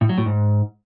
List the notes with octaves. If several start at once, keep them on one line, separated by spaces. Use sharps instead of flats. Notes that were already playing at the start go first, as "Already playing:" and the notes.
A2
F#3
A2
G#2